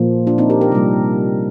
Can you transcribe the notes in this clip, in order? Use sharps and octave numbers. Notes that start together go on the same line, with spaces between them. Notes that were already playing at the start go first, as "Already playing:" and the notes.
Already playing: A#2 F3 A#3
D4 F4
C4 D#4
G4 A#4
G4 A#4
C3 G3 A#3